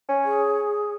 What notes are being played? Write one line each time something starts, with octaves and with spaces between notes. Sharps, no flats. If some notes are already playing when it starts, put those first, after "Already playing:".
C#4
G#4